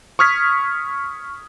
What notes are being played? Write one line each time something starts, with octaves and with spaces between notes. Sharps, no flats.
C#6 D#6 F6 G#6 B6